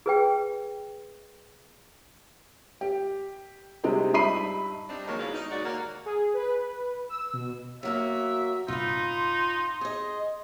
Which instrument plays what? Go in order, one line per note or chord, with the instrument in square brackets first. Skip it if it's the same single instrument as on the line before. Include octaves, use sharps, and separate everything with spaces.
[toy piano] G#4 B4 G5
[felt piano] G4
C3 G3 G#3 D4 D#4 G4
G2 D#4 E5 B5 C7 D#7
[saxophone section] G3 C4 D4 D#4
C3 D#3 F3 F#3 G#3 A#3
E2 B2 G#3 C#4 D5 F5
D#4
D#2 G#2 C#3 F#4 D5
D#2 A#3 F#4 A#4 C#5 F#5
[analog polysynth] G#4
B4
E6
B2
[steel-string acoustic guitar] F#3 A#3 F#4 [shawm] E5
[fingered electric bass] A#1 G2 C3 [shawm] D#4 [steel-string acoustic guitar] F4 B4 [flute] C6
[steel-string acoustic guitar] G#4 D#5